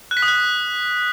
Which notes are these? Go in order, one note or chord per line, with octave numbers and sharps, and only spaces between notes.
F#6
B6
D#6
F#6